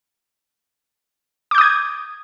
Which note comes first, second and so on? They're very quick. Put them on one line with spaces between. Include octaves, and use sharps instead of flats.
D6 G6 D#6 G#6